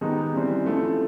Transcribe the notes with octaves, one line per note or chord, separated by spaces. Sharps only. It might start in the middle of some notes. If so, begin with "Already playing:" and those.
D#3 G#3 B3 D#4 G4
C#3 E3 G3 C4
C#3 F3 A3 C4 E4